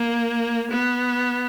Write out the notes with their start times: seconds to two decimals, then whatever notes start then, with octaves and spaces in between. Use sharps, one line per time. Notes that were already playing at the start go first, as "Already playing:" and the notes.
Already playing: A#3
0.71 B3